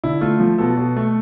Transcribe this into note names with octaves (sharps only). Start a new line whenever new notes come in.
D3 E4
A3 F4
F3
B2 A4
B2
A3